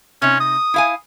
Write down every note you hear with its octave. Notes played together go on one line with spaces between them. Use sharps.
C3 C#4 D#4
D#6
E4 F5 G#5